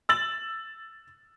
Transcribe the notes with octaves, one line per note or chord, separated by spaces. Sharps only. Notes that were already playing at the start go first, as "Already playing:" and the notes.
E6 A6 F#7